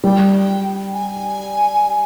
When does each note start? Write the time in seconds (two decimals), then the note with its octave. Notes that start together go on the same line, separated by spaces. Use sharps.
0.04 G3 G5
0.94 G#5